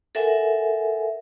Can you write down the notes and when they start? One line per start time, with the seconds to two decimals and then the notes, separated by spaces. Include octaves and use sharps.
0.15 A4 A#4 E5 F#5 G#5